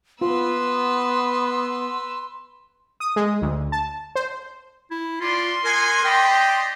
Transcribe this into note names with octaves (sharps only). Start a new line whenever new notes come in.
B3 F4 B4 C6 E6
D#6
G#3
D2
A5
C5
E4
C#4 D4 F4 D5 C6
D#4 A#4 F#5 G#5
G4 D5 D#5 G5